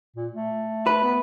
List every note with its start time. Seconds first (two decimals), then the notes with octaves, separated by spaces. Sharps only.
0.16 A#2
0.33 A3
0.87 B4
1.03 B3